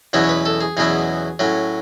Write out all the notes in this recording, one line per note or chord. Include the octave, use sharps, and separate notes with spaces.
E2 B2 F#3 C#4 E4 C#5
C#5
B4
A4
G#4
E2 B2 F#3 C#4 E4 G#4
A2 F#3 C#4